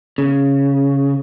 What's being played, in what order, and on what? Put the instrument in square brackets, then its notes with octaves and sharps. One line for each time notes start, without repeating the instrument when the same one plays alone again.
[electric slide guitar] C#3